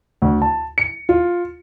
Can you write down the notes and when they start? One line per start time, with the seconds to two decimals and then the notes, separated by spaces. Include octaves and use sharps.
0.22 D2
0.42 A5
0.78 C#7
1.09 F4